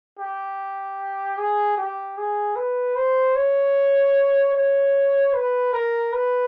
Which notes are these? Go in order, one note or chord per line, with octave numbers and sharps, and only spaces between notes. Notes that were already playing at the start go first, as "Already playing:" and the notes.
G4
G#4
G4
G#4
B4
C5
C#5
C#5
B4
A#4
B4